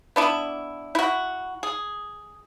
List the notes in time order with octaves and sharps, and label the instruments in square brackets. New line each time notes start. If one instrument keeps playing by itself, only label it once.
[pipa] B3 D4 E4
E4 F#4
G#4